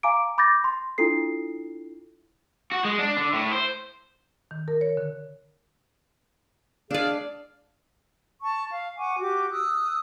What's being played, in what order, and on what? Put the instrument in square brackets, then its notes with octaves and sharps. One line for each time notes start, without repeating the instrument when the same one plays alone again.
[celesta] F5 G#5 A#5 D6 D7
B5 D6 G6 A6 A#6
C6
D4 E4 F4 A4 C7
[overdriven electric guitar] F#4
G#3
D4
D3
A2
C5
[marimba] D#3
A#4
C#5
D3
[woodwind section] G#3 G#4 F5 [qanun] D4 D5
[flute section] A5 C#6
F5
F#5 G#5 C#6 D6
F#4 G4 D6
D#6 E6 F#6